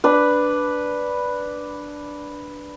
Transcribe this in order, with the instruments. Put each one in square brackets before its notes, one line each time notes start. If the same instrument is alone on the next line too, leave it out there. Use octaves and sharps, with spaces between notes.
[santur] D4 B4